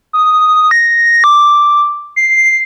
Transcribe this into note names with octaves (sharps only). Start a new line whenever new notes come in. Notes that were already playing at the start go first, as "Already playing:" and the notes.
D#6
A#6
D6
C7